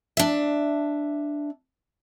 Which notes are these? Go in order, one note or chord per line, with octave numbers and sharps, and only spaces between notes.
D4 E5